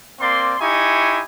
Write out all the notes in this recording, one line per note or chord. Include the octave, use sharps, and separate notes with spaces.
A#3 C4 D5 C6
D#4 E4 G4 G#5 C#6